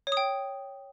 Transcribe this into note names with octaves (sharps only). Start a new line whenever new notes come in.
C#5
D#6
G5